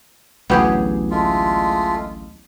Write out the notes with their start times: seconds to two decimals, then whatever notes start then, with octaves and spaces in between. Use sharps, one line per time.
0.50 A1 D2 F#3 B3 G4 G#4
1.11 G#3 A3 F4